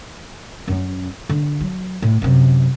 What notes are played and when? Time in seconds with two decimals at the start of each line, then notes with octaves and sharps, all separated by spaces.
0.68 F#2 C#4
1.29 D3
1.61 F#3
2.02 A2
2.22 F#2 C3